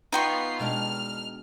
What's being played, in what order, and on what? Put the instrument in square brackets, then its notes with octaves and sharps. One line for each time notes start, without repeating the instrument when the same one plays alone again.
[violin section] B3 F4 C7 [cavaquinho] D#4 G5 C#6
[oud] B2 G#3 D4 [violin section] F6